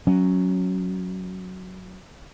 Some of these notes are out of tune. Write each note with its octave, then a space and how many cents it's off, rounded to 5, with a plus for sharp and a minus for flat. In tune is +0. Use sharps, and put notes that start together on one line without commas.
F#3 +0 C#4 +0